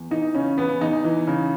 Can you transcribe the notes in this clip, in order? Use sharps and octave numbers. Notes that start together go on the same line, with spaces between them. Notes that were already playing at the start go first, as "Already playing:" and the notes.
Already playing: E2
E3 D#4
C#3 C#4
E2 B3
E2 D#4
E3
C#3